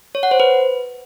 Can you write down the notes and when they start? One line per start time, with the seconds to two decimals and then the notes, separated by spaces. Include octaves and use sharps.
0.15 C#5
0.23 F#5
0.31 C5
0.40 B4